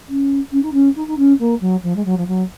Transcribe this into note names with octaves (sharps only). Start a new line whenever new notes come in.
C#4
C#4
D#4
C#4
D#4
D#4
C#4
A#3
F#3
F3
G#3
F#3
F3
F#3